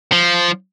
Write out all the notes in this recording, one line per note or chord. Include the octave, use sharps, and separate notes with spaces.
F3